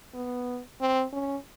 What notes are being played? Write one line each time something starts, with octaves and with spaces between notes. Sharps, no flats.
B3
C4
C#4